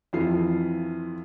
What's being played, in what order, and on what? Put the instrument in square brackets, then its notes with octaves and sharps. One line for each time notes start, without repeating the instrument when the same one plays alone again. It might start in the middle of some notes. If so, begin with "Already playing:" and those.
[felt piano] F2 E3 F4 C7